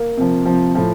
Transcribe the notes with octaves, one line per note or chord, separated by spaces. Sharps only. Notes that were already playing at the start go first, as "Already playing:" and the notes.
Already playing: A#3
C3 F3
C3 F3
A2 F3